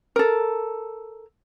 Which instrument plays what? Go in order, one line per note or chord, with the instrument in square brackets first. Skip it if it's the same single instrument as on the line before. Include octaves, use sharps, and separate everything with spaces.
[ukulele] A4 A#4